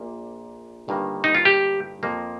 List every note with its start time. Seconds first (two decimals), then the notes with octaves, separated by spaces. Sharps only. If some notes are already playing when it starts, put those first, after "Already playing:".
Already playing: A#1 A#2 A#3
0.88 G1 G2 D#3 A#3
1.24 D#4
1.35 F4
1.45 G4
2.03 F2 F3 A#3